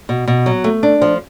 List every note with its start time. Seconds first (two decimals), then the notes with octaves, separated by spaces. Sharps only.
0.09 B2
0.28 B2
0.46 F#3
0.64 A3
0.83 D4
1.01 F3